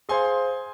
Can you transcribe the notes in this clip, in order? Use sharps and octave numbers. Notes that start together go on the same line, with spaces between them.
G#4 C5 F5 G#5 C6